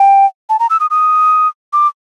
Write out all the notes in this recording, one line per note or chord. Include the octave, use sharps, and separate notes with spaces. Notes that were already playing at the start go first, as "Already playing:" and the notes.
Already playing: G5
A5
A#5
E6
D#6
D#6
D6